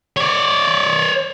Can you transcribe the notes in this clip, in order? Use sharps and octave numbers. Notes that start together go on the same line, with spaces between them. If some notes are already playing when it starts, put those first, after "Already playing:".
C#5 D5